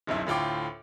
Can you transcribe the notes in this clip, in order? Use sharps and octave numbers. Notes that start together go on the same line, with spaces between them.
D1 B1 F#2 E4
D2 A2 F4 G5 D6